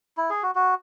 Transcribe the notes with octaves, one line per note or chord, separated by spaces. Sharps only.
E4
G#4
F#4
F#4